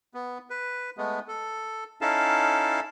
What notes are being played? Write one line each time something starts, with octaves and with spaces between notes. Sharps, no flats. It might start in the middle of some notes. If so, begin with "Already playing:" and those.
B3
B4
G#3 A3 B3
A4
C#4 D#4 E4 A4 F5 A5